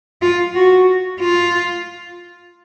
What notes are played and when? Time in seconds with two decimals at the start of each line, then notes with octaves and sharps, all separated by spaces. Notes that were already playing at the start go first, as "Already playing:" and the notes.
0.22 F4
0.55 F#4
1.19 F4